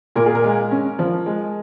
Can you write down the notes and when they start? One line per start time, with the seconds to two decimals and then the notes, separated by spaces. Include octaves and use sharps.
0.16 A#2 A#4
0.26 G#4
0.35 A#4
0.44 G#3
0.71 C#4
0.99 F3
1.26 G#3